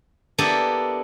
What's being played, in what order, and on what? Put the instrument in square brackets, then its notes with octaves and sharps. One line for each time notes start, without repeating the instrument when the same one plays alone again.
[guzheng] A#3 B3 D4 E4 G4 A4